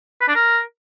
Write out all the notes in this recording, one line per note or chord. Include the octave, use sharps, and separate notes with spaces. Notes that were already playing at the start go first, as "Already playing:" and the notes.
B4
D4
A#4